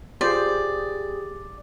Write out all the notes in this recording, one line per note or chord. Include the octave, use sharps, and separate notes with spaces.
F4 G4 G#4 C5 D5